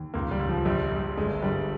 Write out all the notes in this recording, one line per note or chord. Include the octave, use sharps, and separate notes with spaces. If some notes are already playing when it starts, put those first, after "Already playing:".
Already playing: D#2
C#2 A#3
G3
C#2
F3
A#1 G3
A#1
G1 G#3
G1 G3